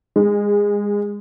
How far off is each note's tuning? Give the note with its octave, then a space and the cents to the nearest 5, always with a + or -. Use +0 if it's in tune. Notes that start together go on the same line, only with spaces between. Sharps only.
G#3 -20